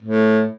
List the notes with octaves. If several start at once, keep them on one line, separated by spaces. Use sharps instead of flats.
A2